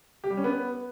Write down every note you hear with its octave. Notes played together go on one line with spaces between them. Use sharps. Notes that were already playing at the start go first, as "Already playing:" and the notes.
G4
G3
C#4
B3